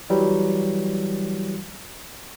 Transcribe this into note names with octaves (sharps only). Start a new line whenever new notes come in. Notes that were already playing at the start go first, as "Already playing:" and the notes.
E3 F#3 G3